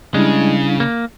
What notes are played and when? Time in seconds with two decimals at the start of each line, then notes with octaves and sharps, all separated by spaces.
0.14 C#3 G3 G#3 D4 E4
0.80 A#3